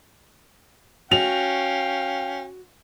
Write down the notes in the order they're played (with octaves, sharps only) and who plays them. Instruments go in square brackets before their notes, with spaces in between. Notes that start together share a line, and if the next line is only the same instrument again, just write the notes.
[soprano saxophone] C#4 [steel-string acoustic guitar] F#4 [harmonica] F5 G5 [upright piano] F7